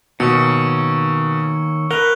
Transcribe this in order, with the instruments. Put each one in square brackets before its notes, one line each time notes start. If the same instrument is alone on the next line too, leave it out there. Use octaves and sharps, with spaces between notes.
[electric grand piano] B2 [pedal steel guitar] D#3 A#3 C#4 [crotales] C#6 E6 C#7
[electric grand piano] A#4 [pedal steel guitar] B4 F#5 [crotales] F#6 F7 G7